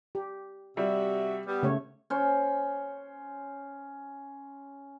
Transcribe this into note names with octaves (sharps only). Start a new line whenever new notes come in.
G4
C3 G3 F#4 E5
G3 B3
C#3 A3 C#5
C#4 C5